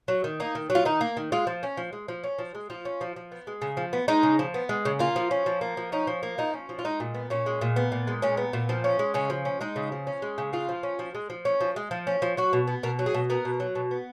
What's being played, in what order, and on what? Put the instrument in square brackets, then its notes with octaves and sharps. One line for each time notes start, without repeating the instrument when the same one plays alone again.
[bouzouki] F#3
D#3
A#3 D#4
D#3
F#3
F4
D#3 D#4
A#3
D#3
G#3 F4
F3
C#4
F3
G#3
F3
C#4
F3
G#3
F3 F4
C#4
F3
F3
B3
G#3
C#3
F3
B3
G#3 D#4
C#3
F3
B3
G#3
C#3
A#3 F4
F3
C#4
F3
A#3
F3
C#4 D#4
F3
A#3
F3 D#4
C#4
F3
F4
G#3 D#4
A#2
B3
A#2 C#4
G#3
A#2
B3
A#2
G#3
A#2 C#4
B3
A#2
F3
C#4
G#3
C#3 C#4
F3
C#4
G#3 D#4
C#3
F3
C#4
G#3
C#3
G#3 F4
F3
C#4
F3
G#3
F3
C#4
F3
G#3
F3
C#4
F3
F#3 F#4
B2
B3
B2 A#4
F#3
G#4
B2
B3 A#4
B2
F#3
B2
B3